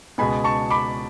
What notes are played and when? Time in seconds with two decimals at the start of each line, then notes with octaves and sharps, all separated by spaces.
0.18 C#2 B2 G#3 B3 G#5 B5
0.44 A5 C#6
0.70 B5 D6